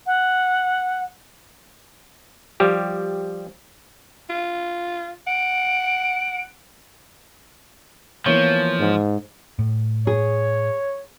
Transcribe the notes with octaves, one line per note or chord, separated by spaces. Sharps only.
F#5
F3 G3 G4
F4
F#5 D7
E3 F3 A#3 B3 C#5
G#2
A2
G#4 C#5